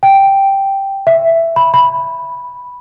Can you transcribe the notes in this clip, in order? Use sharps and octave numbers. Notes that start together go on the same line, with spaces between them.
G5
E5
B5
B5